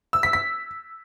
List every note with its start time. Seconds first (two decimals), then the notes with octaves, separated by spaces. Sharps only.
0.13 E6
0.23 B6
0.33 B6